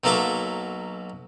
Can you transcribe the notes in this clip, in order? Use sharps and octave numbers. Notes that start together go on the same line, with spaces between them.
B1 F#3 A#3 A4 E5 D6